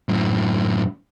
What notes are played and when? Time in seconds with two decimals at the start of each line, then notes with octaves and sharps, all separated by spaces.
0.09 F#2 A2